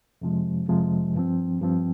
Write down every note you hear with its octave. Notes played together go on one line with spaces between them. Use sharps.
F2 C3 F3 G#3
F2 C3 F3 G#3
G2 F3 C4
G2 F3 C4